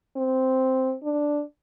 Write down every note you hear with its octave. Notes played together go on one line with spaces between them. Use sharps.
C4
D4